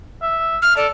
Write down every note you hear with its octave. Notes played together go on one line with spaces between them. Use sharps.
E5
F6
A4 D5